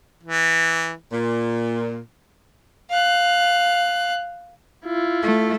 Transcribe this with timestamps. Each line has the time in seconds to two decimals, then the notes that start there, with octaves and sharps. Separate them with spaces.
0.23 E3
1.12 A#2
2.90 F5 F#6
4.85 E4 F4
5.23 A3